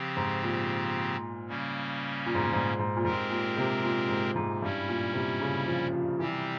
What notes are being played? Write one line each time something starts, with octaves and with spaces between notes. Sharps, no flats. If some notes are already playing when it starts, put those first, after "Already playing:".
Already playing: C#3 F3 C4 G4
G#2
A#2
C#3 G3 A#3 C#4
A#2
G#2
A#2
G#2
G#2
A#2
G#2 G#3 C4 G4 A#4
A#2
C3
A#2
G#2
G#2
G2 G3 C#4 E4
A#2
C3
C#3
F3
F3
C3 E3 G3 C4 G4